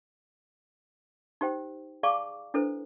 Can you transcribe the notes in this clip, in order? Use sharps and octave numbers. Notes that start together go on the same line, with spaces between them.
D#4 G4 C5 G5
G#4 D5 F5 A5 C#6 D6
D4 E4 A4 B4 C5